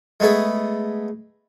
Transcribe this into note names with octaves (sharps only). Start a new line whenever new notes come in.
G#3 A3 B3 G#4